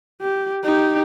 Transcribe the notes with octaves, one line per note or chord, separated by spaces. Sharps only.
G4
D#4 G4